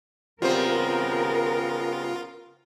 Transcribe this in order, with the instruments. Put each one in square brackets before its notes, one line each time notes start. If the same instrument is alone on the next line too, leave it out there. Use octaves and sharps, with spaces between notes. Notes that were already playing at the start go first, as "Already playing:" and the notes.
[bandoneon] C#3 B3 [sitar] G3 C4 C5 [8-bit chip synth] F4 [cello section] A#4